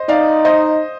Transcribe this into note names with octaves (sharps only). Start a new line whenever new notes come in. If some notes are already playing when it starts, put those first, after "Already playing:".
Already playing: C5 D#5
D#4 D5 F5
C5 D#5